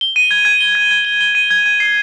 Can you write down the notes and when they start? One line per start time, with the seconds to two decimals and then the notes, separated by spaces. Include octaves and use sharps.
0.01 G7
0.16 D#7
0.31 G#6
0.45 G#6
0.60 G7
0.75 G#6
0.91 G#6
1.05 G7
1.21 G7
1.35 D#7
1.51 G#6
1.66 G#6
1.80 C7